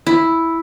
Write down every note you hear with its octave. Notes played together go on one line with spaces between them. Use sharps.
E4